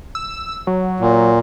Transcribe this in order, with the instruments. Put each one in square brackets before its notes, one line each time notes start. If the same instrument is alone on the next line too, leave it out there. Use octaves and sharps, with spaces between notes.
[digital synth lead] E6
F#3
[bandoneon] A#2